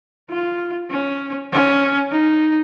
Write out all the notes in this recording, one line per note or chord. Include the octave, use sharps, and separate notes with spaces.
F4
C#4
C#4
D#4